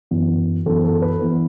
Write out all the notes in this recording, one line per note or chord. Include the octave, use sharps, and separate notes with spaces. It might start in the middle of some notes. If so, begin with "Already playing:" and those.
F#2 E3 B3
F#2 E3 B3 A4
A4
B4
E3 B3